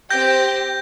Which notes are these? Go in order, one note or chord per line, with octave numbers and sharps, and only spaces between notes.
C4 G4 G5 G6 A#6